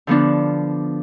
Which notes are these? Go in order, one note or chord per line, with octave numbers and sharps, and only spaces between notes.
D3 F3 B3 D4